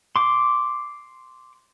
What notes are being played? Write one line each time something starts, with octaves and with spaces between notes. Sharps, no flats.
C6 D6